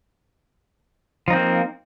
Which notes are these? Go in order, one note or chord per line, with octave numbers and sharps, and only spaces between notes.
F3 A#3 C4 D#4